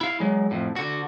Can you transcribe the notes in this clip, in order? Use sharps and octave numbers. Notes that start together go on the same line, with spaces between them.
E4 F5
F#3 G#3
F2 A2
D3 F#4